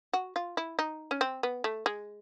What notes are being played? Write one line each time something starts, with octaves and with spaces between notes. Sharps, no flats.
F#4
F4
E4
D#4
C#4
C4
B3
A3
G#3